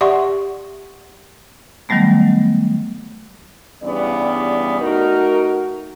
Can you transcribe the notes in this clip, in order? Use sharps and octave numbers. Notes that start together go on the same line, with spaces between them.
G4 D5 E5 F#5 C6 C#6
D#3 F#3 G3 A3 B3
G2 C#3 E3 G3 B3 D5
A3 D#4 F#4 A#4